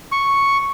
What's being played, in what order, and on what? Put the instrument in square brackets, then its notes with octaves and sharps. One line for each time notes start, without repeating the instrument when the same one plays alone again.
[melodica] C#6